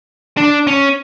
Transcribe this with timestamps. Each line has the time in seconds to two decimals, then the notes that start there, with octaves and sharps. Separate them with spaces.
0.37 D4
0.67 C#4